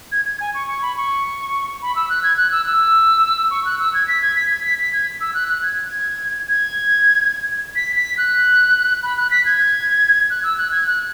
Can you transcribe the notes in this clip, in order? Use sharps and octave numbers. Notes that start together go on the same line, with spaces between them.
G#6
G#6
G#5
C#6
C#6
B5
C#6
B5
E6
F#6
G#6
F#6
E6
E6
C#6
F#6
E6
G#6
B6
G#6
B6
G#6
B6
B6
G#6
E6
F#6
F#6
G#6
G#6
B6
B6
F#6
B5
F#6
B6
G#6
F#6
E6
F#6
G#6
F#6